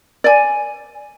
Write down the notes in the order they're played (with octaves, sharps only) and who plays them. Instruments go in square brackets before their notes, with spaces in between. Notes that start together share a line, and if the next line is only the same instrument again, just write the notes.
[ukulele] D5 G#5